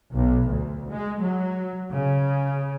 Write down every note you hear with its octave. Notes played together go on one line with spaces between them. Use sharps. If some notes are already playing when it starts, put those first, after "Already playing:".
B1
D2
G#3
F#3
C#3